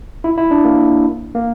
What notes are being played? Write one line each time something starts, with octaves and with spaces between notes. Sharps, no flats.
E4
E4
D4
A#3
A#3